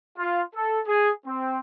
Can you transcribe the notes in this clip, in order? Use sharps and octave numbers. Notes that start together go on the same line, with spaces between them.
F4
A4
G#4
C4